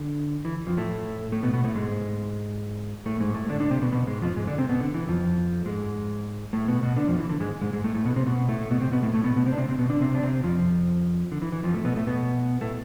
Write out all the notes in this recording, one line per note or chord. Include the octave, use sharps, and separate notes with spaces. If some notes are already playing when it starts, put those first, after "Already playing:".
Already playing: D3
E3
F2 F3
A2 A3
A2 A3
B2 B3
B2 B3
A2 A3
G#2 G#3
A2 A3
G#2 G#3
A2 A3
D3 D4
D3 D4
C3 C4
B2 B3
B2 B3
G#2 G#3
F2 F3
G#2 G#3
D3 D4
C3 C4
B2 B3
D3
E3
F2 F3
G#2 G#3
A2 A3
B2 B3
B2 B3
D3 D4
F2 F3
E3
D3
G#2 G#3
G#2 G#3
G#2 G#3
A2 A3
A2 A3
B2 B3
C3 C4
B2 B3
A2 A3
B2 B3
C3 C4
B2 B3
A2 A3
A2 A3
B2 B3
B2 B3
C3 C4
D4
C3 C4
C3 C4
B2 B3
D3 D4
C3 C4
D4
C3 C4
F2 F3
D3
E3
E3
F2 F3
A2 A3
B2 B3
A2 A3
B2 B3
A2 A3